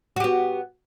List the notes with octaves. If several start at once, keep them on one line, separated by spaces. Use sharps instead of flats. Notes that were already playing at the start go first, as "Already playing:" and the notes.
B3 F#4 G4